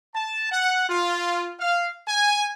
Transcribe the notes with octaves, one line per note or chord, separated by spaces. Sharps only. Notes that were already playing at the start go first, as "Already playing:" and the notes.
A5
F#5
F4
F5
G#5